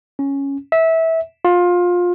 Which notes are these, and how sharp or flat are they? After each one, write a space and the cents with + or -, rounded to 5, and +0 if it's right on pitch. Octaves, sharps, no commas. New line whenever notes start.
C#4 +0
E5 -20
F4 +20